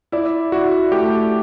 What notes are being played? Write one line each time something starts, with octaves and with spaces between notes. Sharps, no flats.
E4 D5
E4 F#4
A3 G4